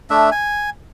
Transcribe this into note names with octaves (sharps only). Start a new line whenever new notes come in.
A3 D4 E5
G#5